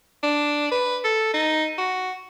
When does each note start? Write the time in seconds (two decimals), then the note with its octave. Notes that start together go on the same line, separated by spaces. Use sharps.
0.23 D4
0.71 B4
1.04 A4
1.34 D#4
1.78 F#4